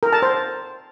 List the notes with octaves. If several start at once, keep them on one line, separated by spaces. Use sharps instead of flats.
A#4
A5
C5